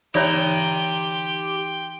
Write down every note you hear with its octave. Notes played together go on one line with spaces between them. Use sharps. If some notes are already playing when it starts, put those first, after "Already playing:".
E3 D#4 G4 C#5 D5 G5 A#5 C6